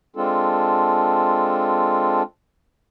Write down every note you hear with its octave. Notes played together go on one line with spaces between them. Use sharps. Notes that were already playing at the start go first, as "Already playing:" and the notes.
G#3 C4 D4 F4 A4